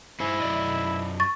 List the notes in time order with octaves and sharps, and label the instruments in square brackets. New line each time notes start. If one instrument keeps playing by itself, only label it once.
[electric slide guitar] G2 C5 G#5 [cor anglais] E4
[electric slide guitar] F#2 D5 D#5
[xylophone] C#6 A6